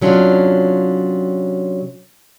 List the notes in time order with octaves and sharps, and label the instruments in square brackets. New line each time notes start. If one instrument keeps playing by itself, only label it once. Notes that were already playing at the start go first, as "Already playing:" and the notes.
[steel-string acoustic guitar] C3 F#3 C#4 D4 F4